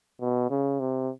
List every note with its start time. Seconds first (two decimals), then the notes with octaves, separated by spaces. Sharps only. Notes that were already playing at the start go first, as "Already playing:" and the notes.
0.21 B2
0.50 C#3
0.80 C3